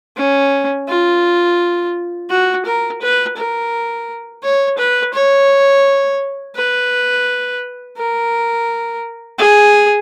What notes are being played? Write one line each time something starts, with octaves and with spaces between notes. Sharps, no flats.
C#4
F4
F#4
A#4
B4
A#4
C#5
B4
C#5
B4
A#4
G#4